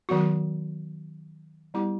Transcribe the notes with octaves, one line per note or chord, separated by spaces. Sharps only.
D#3 F#3 B3 F#4
G3 B3 E4 G4